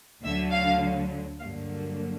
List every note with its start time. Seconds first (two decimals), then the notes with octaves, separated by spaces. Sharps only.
0.24 D2 D3 F#3 E5
0.52 F5
1.40 G2 D3 F#3 A#3 F5